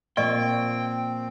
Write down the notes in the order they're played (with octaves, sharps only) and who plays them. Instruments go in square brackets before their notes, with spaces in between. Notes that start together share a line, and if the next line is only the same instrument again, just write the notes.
[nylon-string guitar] A#2 F3 A#3 [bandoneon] C4 [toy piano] D5 D#5 C#6 [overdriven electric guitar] G5